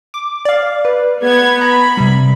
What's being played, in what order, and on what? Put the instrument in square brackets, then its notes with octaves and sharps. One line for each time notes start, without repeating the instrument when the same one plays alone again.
[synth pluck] D6
D5 F5
B4
[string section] B3 G#6
[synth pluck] A#5 [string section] B5
[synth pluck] C3 G3